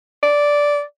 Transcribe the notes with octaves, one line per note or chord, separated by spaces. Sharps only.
D5